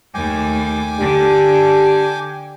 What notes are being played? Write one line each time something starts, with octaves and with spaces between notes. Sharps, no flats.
D#2 A3 G5 G#5 D6
D3 D4 G4